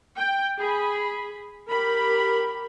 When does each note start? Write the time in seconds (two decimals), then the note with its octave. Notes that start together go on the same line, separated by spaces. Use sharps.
0.17 G5
0.58 G#4 B5
1.70 G4 A#4 B5